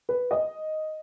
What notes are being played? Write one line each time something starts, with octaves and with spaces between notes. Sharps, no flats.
B4
D#5